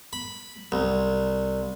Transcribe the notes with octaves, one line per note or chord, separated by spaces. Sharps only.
B5
C2